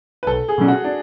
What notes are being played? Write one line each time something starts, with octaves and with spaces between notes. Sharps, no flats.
B4
B1 A4
G#4
B2 F#3 C#4
F#4
D4